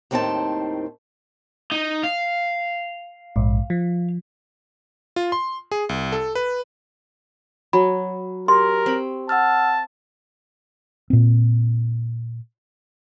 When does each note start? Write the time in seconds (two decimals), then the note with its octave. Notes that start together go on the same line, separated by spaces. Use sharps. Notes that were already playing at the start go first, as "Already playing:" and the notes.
0.11 D#2 A2 D#3 C4 C5 A5
1.72 D#4
2.04 F5
3.36 A#1 G#2
3.70 F3
5.16 F4
5.32 C6
5.72 G#4
5.89 C2
6.12 A4
6.35 B4
7.73 F#3 B5
8.48 G4 A#4 C6
8.86 C4 B5
9.29 F#5 A5 E6 F6
11.10 A#2 C4